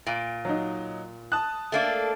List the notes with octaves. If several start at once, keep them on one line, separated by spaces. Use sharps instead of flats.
A#2 D7
F#3 D#4
A5 D#6 F#6
A3 A#3 D4